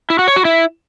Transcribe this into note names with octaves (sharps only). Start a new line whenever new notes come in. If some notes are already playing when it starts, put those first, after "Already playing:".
E4
F#4
C#5
F#4
E4